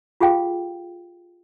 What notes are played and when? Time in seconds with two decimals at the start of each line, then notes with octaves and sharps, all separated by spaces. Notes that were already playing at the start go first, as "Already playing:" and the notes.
0.20 F4 G4 G#4 F5 G5